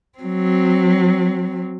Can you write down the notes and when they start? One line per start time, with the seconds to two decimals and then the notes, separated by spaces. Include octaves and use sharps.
0.19 F#3 C4